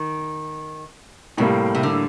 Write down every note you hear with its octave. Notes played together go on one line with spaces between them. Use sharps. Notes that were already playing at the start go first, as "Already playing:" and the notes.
Already playing: D#3
A2 C3 G3 A#3
C3
D3